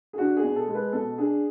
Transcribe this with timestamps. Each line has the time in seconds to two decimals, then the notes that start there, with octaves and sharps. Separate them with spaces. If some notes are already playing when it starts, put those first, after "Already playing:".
0.13 G#4
0.18 D4 F#4
0.37 G#4
0.43 B2
0.56 A4
0.68 G#3
0.75 B4
0.93 B2 A4
1.18 D4 G#4